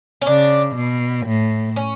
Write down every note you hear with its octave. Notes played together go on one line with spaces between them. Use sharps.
C#4
C#3 D4
B2
A2
C#4